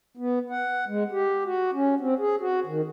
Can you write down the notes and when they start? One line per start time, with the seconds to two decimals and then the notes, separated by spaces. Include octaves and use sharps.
0.17 B3
0.50 F#5
0.88 G#3
1.12 G4
1.45 F#4
1.74 C#4
2.00 C4
2.19 G#4
2.40 F#4
2.66 D#3